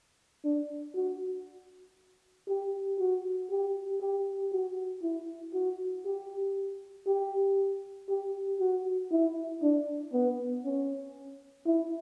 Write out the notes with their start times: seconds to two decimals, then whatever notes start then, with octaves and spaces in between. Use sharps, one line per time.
0.44 D4
0.95 F#4
2.48 G4
2.99 F#4
3.50 G4
4.01 G4
4.52 F#4
5.03 E4
5.53 F#4
6.05 G4
7.07 G4
8.09 G4
8.60 F#4
9.11 E4
9.62 D4
10.13 B3
10.65 C#4
11.66 E4